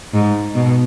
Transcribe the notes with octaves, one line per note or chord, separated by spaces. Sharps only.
G#2
B2